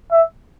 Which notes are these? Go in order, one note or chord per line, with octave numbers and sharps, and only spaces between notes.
E5